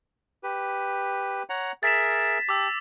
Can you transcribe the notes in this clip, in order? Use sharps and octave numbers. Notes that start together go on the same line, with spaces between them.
G4 B4
C#5 F#5 A#5
G#4 A#4 E5 A6 B6 E7
G4 A5 D6 E6